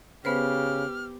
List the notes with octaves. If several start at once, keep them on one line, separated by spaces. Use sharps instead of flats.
C#3 B3 G4 B4 C5 F6